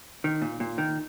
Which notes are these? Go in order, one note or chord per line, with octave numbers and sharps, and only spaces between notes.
D#3
A#2
A#2
D#3